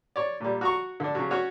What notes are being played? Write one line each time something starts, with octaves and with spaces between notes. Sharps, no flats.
C#5 D5
A#2 G3
F#4 A#5 C#6
D3 D4
C#3 F#3
C#4 F#4 C#5